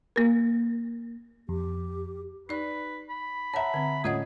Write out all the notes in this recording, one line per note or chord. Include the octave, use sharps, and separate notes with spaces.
A#3 A#4
F2 G4
D#4 B4 D5
B5
C#5 E5 F#5 A5 A#5
D3 C4
A2 C#4 F4 G#4 D#5 F#5 G#6